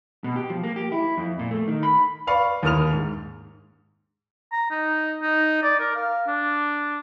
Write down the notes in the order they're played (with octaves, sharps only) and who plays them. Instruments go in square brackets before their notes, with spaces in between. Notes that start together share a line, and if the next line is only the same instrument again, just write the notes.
[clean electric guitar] B2
G4
F3
A#3
G4
E4
F2
A#2
A3
D#3
B5
[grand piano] B4 D5 F5 B5 C#6
D#2 E4 A#4 D#6 F6 F7
G#2
[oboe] A#5
D#4
D#4
D5
A#4
F5
D4